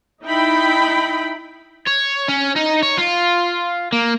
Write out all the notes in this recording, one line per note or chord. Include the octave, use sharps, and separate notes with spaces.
D#4 E4 G5 B5
C#5
C#4
D#4
C#5
F4
A#3